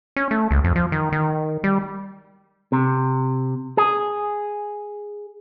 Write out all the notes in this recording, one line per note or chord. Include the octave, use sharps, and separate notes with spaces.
C#4
A3
C#2
F2
F3
D#3
D#3
G3
C3
G#4